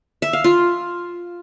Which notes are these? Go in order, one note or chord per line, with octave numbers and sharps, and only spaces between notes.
E5
F5
F4